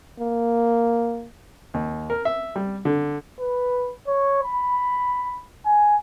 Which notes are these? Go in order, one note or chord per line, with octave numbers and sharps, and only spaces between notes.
A#3
D#2
A#4
E5
G3
D3
B4
C#5
B5
G#5